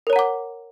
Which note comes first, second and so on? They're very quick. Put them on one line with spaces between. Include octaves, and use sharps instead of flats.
A#4 C#5 A#5 F#5 D6